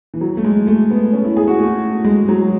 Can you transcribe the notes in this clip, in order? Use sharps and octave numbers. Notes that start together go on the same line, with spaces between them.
E3
F#3
A3
G#3
A3
B3
C#4
E4
G#4
F#4
A3
G#3
F#3